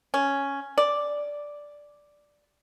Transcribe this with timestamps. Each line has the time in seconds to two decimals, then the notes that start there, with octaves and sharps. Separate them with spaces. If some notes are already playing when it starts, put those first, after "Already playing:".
0.14 C#4
0.78 D5